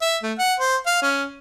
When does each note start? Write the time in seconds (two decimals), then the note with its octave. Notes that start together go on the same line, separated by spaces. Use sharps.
0.01 E5
0.23 A3
0.38 F#5
0.60 C5
0.86 F5
1.02 C#4